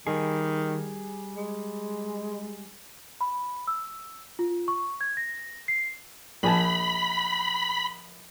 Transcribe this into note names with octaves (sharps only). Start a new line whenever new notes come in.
D#3 G3 G#4
G#3
B5
E6
F4
C#6
G#6
A#6
C7
A#1 G#5 A5 B5